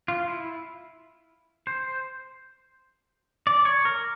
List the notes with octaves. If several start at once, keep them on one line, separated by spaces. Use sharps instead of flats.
F4
E4
C5
D5
C#5
A#4